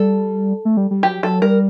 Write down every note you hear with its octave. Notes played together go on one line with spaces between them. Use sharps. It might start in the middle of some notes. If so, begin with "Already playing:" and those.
Already playing: G3 A4
A3
G3
G3
F#3 G4
F#3 A4
G3 A#4